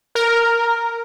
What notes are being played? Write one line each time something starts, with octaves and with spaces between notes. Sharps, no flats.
A#4